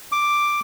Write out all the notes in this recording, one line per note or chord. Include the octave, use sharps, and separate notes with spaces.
D6